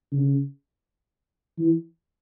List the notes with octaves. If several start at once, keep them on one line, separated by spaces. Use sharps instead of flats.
C#3
E3